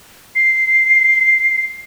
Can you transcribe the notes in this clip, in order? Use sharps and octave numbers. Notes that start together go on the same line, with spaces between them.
C7